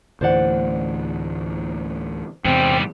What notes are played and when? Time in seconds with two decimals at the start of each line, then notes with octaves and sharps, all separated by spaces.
0.21 D2 A2 E3 C5 D5 F#5
2.45 E2 G#2 C3 G3 C4